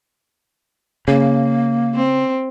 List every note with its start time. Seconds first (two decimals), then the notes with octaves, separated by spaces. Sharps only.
1.08 C#3 A#3
1.94 C4